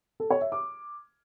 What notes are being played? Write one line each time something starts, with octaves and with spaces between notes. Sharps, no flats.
A4
C#5
E5
D6